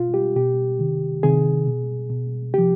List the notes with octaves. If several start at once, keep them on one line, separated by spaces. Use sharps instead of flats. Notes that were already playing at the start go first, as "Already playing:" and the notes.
Already playing: B2 F4
G4
B2 G4
C3 D#3
C3 D#3 G#4
B2
B2
C3 F3 G4